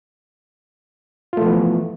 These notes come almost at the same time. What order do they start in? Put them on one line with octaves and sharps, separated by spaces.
F4 A3 F3 B3 E3